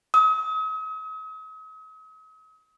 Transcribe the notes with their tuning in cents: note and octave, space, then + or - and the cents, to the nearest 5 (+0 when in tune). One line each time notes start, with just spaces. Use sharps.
D#6 +45